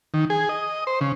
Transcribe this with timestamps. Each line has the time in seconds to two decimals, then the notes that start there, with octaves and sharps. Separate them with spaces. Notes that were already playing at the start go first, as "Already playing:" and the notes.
0.14 D#3
0.30 G#4
0.49 D#5
0.87 C5
1.01 C#3